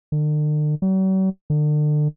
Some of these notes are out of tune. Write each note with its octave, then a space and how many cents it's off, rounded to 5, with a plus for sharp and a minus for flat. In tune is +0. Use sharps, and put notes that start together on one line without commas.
D3 +45
F#3 +45
D3 +35